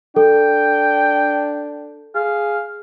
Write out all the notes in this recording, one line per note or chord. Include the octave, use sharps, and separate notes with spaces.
D4 A4 G5
G#4 F5